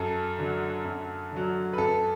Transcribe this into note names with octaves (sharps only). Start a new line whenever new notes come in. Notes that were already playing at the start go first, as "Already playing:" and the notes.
Already playing: F#2 A4
D3 F#3
F#2
D3 F#3
B4
F#2 A4